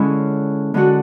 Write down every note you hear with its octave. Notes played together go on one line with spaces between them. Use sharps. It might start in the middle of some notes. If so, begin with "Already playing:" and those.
Already playing: D3 G#3 C#4 E4
D3 G#3 D4 F#4